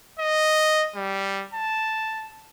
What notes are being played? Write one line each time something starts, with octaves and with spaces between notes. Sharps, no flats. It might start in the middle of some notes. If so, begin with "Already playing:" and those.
D#5
G3
A5